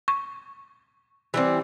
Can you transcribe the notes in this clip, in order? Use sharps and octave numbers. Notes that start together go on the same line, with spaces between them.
C#6
E3 G3 C4